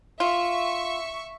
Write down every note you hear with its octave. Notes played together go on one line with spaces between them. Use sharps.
F4 E5 C#6